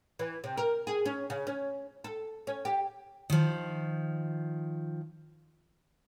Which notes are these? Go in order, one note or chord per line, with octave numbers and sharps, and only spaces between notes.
E3
C3
A#4
G#4
C#4
C#3
C#4
A4
C#4
G4
D#3 F3